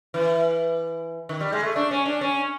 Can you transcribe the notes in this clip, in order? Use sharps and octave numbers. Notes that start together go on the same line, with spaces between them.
E3
D#3
G3
G#3
A3
D4
C#4
D4
C#4